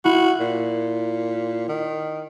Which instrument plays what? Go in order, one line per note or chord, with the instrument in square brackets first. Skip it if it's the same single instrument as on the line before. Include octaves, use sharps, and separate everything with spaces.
[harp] E4 [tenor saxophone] F#4
[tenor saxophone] A#2
D#3